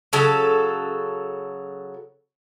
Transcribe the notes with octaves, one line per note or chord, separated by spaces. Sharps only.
C#3 F#3 A4